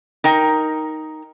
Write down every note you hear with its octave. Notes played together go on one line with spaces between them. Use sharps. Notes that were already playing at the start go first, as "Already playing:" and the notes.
D#4 A#4 G5